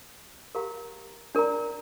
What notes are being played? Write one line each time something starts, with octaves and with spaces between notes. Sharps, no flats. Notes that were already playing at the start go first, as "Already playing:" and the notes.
G4 A#4 F5 A#5
D4 A#4 D5 A#5